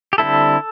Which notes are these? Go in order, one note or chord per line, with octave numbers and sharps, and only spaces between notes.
G4
D3 G3 C4 E4 A4